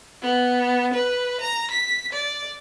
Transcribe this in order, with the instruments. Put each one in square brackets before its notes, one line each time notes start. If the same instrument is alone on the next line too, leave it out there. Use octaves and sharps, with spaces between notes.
[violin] B3
B4
A#5
B6
D5